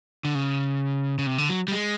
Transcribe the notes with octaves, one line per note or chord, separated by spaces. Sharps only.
D3
C#3
C#3
C3
D3
F#3
G3
G#3